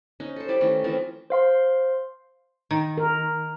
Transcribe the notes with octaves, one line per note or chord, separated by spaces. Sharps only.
C#4 D#4
A4 C5
G3 E4 D5 D6
D#3 E3 A3 C#4
E3 F3 C4 F4
C5 F5 C6
D#3
A#4